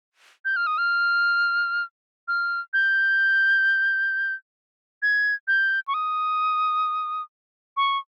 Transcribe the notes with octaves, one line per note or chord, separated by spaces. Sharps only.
G6
F6
D#6
F6
F6
G6
G#6
G6
C#6
D#6
C#6